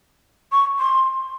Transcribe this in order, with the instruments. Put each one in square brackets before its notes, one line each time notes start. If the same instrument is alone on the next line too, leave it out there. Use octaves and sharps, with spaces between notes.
[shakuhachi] C#6
C6